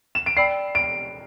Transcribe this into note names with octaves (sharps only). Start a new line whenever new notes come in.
E7
D7
D5 G5 B5 E6 C7
D7